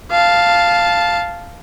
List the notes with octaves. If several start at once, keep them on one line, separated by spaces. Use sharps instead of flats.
F5 A5